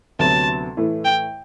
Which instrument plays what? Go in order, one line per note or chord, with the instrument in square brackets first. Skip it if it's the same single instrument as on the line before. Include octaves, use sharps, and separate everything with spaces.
[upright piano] D2 C3 F#3 B3 [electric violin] A5
[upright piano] A2 E3 A3
[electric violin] G5